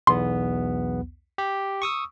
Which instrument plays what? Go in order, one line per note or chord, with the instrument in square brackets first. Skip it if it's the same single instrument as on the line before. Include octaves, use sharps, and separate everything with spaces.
[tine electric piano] B1 E2 B3 [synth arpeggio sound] C6
[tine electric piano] G4
C#6 D#6 E6